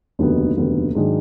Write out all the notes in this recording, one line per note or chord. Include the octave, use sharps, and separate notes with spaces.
F1 D#2 D3 F#3 B3
F1 D#2 D3 F#3 B3
G#2 D#3 F#3 D4 G#4